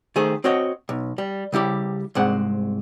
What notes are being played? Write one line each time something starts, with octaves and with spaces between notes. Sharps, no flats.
D#3 A3 G#4 C5
C4 F#4 C#5 D#5
B1
G3
C#3 G3 E4 G4
C2 G#2 G#3 C4 F#5